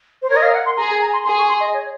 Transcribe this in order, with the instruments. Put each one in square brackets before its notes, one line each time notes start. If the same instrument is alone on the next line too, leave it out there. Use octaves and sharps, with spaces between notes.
[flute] C5
[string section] A#4 [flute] C#5
[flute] D#5
F5
F#5
C6
[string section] G#4 [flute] A#5
[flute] G#5
A#5
C6
[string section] G#4 [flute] C6
[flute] C#6
C6
D#5
C#5